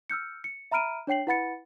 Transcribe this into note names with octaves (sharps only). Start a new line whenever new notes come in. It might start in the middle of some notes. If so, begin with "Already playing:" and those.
E6 F6 G6 C#7
C#7
E5 A#5 B5 F6 D7 D#7
D4 C#5 G5 C7 F#7
E4 B4 F#5 B5 A6 C#7